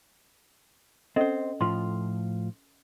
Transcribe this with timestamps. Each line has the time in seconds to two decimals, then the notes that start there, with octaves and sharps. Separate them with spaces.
1.16 C4 C#4 A4 C5 D#5
1.61 A2 F3 F4 C6